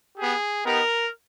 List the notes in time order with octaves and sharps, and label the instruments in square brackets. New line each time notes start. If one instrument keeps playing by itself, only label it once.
[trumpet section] B3 G4 G#4
B3 D#4 G4 A#4